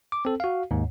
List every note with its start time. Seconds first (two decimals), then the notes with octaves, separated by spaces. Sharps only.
0.12 D6
0.25 C4 A4
0.40 F#4 F5
0.71 D#2 G#2